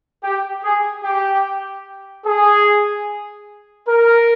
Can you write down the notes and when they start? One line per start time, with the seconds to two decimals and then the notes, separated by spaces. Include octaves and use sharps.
0.23 G4
0.64 G#4
1.04 G4
2.26 G#4
3.88 A#4